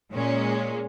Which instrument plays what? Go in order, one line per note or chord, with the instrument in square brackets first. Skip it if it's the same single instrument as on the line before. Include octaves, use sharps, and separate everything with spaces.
[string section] A#2 G#3 C#4